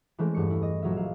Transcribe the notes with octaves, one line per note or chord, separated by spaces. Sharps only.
E3 G#3 A3 C4 C#4
E2 G2 C#6 C#7
E4
D#5
A#1 F#3 D#5 E5
F5